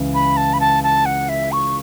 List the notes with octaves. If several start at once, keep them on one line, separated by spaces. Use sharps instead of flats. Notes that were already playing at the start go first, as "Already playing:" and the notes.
Already playing: C#2 C#3 E3
B5
A5
B5
A5
A5
F#5
E5
C#6